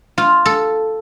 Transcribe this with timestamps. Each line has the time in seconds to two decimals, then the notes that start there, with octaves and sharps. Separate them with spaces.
0.18 F4
0.46 A4